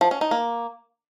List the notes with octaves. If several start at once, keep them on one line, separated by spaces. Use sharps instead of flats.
F3
C#4
D#4
A#3